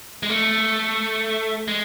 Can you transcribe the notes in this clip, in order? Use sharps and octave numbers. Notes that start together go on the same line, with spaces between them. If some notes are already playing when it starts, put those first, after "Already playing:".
G#3
A3
G#3